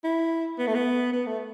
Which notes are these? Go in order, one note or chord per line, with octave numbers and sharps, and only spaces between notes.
E4
B3
A3
B3
B3
A3